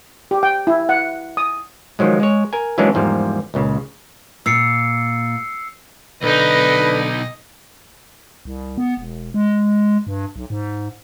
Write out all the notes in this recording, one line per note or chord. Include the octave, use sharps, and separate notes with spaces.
G4
G5
E4
F#5
D#6
D#3 F3 F#3 G#3
G#3 C#5
A#4 G#5
E3 F#3 G#3 A#3 C#4 D4
E2 G#2 F3 G3 A#3
C#2 A#2 C#3
A#2 E6 C7 C#7
B1 D3 D#4 B4 D#5
C2
B3
E1
G#3
G2
B1
G#2